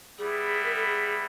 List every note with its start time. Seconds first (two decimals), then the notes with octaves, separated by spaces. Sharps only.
0.18 G3 B3 E4 G#4
0.64 A#4
0.75 A4
0.86 G#4